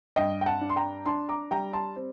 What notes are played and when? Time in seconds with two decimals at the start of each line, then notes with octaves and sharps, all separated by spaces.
0.16 G2 D#5 G5
0.41 G5
0.46 F#5 A5
0.61 D4
0.69 C6
0.76 G5 A#5
1.06 D4 A5 C6
1.29 A#5 D6
1.51 G3 G5 A#5
1.73 A5 C6
1.96 C4